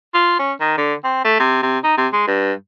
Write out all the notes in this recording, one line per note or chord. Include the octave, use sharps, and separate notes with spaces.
F4
C#4
D#3
D3
C4
A3
C3
C3
D#4
C3
G#3
G2